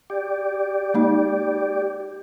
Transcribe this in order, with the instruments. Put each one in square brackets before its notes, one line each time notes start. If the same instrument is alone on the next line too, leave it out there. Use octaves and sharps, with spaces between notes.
[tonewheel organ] G4 D5
[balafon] G#3 A#3 D#4